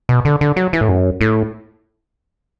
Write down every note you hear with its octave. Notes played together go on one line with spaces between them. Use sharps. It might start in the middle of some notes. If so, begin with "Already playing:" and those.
B2
D3
D3
F#3
E3
A2
F#2
A2